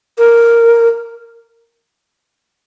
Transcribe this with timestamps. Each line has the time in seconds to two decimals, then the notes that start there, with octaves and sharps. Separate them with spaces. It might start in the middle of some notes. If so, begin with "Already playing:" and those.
0.18 A#4